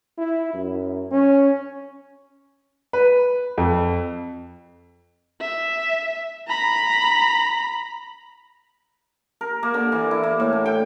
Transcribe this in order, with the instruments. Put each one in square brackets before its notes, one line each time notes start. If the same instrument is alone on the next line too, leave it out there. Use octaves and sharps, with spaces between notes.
[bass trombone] E4
F#2
C#4
[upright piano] B4
F2
[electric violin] E5
A#5 B5
[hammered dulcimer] A#4
A#3
D3
E3
E4
A#3
A2
D3
G5